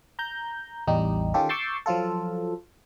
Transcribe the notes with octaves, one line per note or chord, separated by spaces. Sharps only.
A#5 G6
A1 E2 G3 D#4 G4
D#3 C#4 F4 G4 A4
C#6 D6 E6 G6 A6 C7
F3 F#3 F4 A4